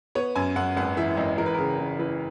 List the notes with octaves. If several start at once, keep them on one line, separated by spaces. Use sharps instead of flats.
B3 C#5
F#2 G#5
F#2 F#5
G#1 F#5
E3 E5
G#1 D#5
E3 A#4
B4
C#3 A#4
C#3
E3 B4